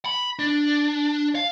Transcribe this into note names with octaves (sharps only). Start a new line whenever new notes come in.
B5
D4
F5